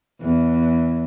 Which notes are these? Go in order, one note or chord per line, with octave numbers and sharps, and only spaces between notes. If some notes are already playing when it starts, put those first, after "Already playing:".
E2